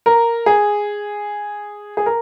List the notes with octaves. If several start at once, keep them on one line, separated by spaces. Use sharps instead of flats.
A#4
G#4
G#4
A#4